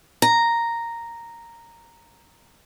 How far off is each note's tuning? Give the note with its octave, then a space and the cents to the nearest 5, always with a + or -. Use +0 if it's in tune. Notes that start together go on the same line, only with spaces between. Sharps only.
A#5 -5